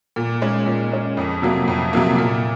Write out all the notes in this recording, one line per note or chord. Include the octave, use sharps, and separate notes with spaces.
A#2
G#3 C#4
A#2
G#3 C#4
F2
C3 F#3 A#3
F2
C3 F#3 A#3
A#2